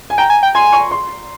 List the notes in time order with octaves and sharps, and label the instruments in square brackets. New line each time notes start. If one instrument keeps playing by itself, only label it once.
[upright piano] G#5
[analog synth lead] G5 [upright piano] A#5
[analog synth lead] G#5
G5
[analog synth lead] G#5 [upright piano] C6
[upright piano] C#6
C6